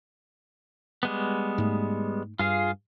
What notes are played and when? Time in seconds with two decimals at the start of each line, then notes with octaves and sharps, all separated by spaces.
1.03 G3 G#3 B3
1.58 G#2 A3
2.39 G2 F4 G#4 F5